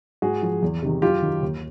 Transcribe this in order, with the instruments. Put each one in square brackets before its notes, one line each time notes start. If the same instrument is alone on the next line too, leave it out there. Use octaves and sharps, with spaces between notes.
[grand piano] G#2 F#4 G#4
F3
E2
C3 D#3
F#2 F4 G4
D#3
D#2